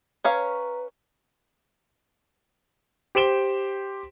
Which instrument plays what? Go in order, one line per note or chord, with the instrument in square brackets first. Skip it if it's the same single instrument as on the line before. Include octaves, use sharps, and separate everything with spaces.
[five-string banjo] C#4 C#5 F5 [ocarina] B4 [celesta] A#5
[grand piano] G4 C5 D7 E7 G7